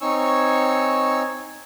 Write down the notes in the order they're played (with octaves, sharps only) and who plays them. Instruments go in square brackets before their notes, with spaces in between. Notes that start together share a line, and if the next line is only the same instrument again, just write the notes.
[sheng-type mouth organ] C4 D#4 C#5 G#5 C#6 E6